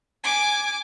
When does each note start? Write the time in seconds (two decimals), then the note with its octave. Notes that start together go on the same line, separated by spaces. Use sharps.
0.24 G#5 D6